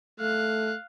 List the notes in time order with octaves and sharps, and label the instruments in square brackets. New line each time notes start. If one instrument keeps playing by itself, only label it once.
[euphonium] A3 [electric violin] F5 F#6